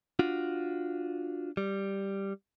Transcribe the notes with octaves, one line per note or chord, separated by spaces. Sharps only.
D4 F4 F#4
G3